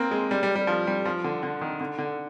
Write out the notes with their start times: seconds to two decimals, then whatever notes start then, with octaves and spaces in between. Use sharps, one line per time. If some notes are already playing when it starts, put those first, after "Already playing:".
Already playing: A#3 C4
0.11 G#3
0.31 G3
0.43 G3
0.55 G3
0.67 F3
0.87 G3
1.05 F3
1.24 D3
1.43 D3
1.61 D#3
1.81 D3
1.98 D3